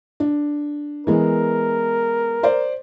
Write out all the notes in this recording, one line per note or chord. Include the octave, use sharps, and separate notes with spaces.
D4
E3 G#3 B3 A#4
C5 D5